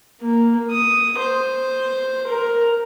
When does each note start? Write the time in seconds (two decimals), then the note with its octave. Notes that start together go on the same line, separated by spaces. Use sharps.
0.21 A#3
0.71 D#6
1.18 C5
2.27 A#4